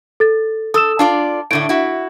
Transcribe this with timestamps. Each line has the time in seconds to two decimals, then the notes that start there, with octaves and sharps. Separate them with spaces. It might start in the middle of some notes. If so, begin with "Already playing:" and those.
0.20 A4 A6
0.74 A4 D#6 E6 E7
0.99 D4 F4 D5 A5
1.51 A2 D3 A3 D7
1.69 E4 F#4